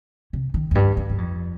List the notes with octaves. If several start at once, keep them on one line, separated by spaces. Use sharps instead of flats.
C3
D#3
F2
G2
G2
G2
F2